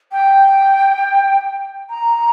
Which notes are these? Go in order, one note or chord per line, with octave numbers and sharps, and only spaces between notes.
G5
A#5